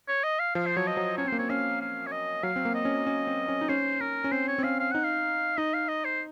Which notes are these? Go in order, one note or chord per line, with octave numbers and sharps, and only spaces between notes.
C#5
D#5
F5
F3 F5
C5
F#3 C#5
D#5
F#3
C#4 C#5
C4
A#3 C5
C4 C#5
C#4 F5
F5
C#5
D#5
F#3 F5
C4
A#3
D#5
C#4
C#4
C4
C#4
D#4
C#4 C5
C#4 A#4
C#4
C4 C5
C#5
C4
C#4 F5
F5
D#4 F#5
F5
D#4 D#5
F5
D#5
C5